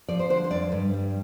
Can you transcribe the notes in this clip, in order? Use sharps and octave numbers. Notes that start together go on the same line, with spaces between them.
F3 D5
C5
D3 C5
C5
F2 D5
G2
G3